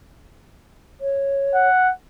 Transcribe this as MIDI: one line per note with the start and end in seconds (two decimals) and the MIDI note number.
1.01 1.68 73
1.55 1.91 78